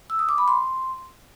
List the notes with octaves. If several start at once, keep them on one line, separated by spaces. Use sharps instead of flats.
E6
D#6
D6
B5
C6